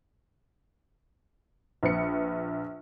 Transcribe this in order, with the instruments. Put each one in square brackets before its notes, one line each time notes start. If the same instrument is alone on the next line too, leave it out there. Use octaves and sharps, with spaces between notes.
[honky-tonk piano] A#1 B4 C#7